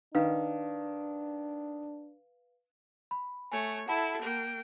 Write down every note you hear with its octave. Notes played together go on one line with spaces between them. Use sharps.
D#3 D4 B4 F5
B5
A3 C#5 G#5
E4 A4 F#5 A5 B5
A#3 G5